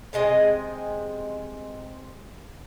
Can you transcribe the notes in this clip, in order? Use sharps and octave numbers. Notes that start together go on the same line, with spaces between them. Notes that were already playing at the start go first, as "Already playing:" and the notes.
C3 G#3 D#5 G#5